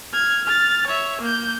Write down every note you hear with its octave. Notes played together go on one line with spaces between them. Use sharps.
F6 G#6
F6 A6
C#5 E5
A#3 G6